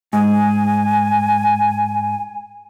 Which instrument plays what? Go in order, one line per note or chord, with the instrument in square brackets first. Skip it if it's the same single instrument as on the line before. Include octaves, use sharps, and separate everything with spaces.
[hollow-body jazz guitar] G#2 [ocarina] G#5